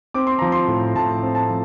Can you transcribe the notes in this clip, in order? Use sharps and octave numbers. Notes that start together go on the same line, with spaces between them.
C4 D6
C6
F3 A#5
C6
A2
A2 A5
C4
A5
F3